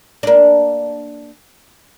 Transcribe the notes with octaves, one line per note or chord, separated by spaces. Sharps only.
A#3 D4